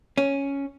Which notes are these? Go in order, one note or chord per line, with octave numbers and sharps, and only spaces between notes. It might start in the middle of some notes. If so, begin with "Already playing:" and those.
C#4